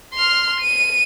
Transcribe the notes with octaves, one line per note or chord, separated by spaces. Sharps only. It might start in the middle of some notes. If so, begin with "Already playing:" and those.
C6 F6
D#7